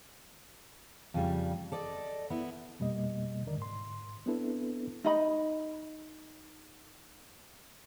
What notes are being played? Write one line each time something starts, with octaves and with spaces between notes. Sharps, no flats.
F2 C#3 G3
A4 D5 D#5
B3 E4
F2 B2 G3 A#3 D#5
D#2 D3 D#3 A#4 D5
G#2 C6
B3 C4 D4 E4 A4 B4
D#4 D#5 B5